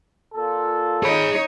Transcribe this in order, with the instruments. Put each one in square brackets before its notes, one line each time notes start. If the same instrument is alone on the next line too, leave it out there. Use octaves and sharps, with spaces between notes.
[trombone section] A#2 F4 A4
[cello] D#4 C#5 [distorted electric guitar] G#4 B5